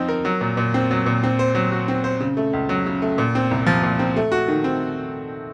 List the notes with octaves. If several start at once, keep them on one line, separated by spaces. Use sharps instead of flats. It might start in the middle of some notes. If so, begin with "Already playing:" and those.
Already playing: F3 C4 D#4
A#4
F#3
A#2
A#2
C4
F#3
A#2
C4
C5
F#3
F#4
C4
C5
C#3
A3
C#2
F#3
C#3
A3
A#2
C4
C2
F3
A#2
C4
A3
F#4
D#3
C4